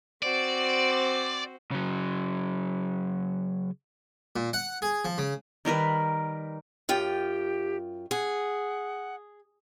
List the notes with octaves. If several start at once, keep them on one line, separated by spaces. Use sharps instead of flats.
C4 F#4 C5 D5
C#3 F#3
A#2
F#5
G#4
F3
C#3
D#3 G3 A#4 B4
F#2 F4 G4 G5
G#4 F#5